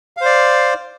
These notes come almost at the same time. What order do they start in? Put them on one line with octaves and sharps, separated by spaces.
F5 C5 D5